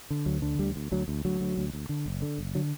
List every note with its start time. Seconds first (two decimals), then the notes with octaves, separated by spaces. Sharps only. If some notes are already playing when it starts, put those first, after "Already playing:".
0.10 D3
0.26 D2 F#3
0.42 D3
0.59 D2 G3
0.76 D2
0.92 D2 F#3
1.08 D2
1.25 D2 F#3
1.40 D2
1.57 D2
1.73 D2
1.89 D3
2.06 F#1
2.22 D3
2.38 F#1
2.55 D3 F#3